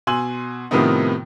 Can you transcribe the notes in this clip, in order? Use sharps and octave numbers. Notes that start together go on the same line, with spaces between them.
B2 G#5 C6 E6 F#7
A2 C3 D#3 F3 B3 D#4